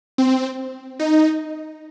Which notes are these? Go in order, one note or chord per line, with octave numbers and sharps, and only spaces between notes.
C4
D#4